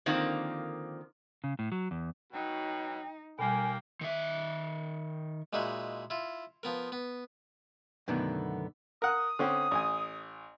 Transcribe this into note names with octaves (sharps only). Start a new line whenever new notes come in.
D3 D#3 F3 A#3 C4
C#3
A2
F#3
E2
B2 F#3 D#4 G5
D#2 B2 G3 A#3 G5 G#5
D#3 E5
A#2 G#3 D#4 E4 F#4
E4 F4
F3 B3 A#4
B3
F#2 B2 D3 D#3 A3 B3
A#4 F#5 D#6
D3 C4 C#4
A1 G#5